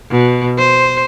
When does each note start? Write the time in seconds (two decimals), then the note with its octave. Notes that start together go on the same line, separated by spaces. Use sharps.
0.11 B2
0.58 C5